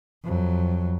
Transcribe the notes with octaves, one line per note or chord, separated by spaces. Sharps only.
F2 F#3